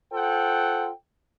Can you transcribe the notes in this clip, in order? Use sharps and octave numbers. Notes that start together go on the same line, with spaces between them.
F4 A4 C5 F#5 G5